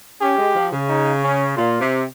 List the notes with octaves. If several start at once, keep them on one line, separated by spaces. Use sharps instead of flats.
C#4 G4
G#3
F3
C#3
D#4
C#4
A#2 F4
C3